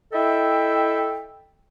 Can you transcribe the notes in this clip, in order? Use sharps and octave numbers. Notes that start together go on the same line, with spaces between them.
E4 A4 D#5 E5 G5